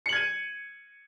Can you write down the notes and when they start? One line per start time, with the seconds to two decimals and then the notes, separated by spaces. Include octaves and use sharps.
0.06 C#7
0.09 F#7
0.13 G#6
0.16 D#7